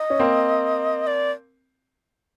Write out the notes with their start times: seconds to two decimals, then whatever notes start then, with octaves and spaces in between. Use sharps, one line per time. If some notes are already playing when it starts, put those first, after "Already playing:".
Already playing: D#5
0.10 C#4
0.19 A#3 C4
1.07 D5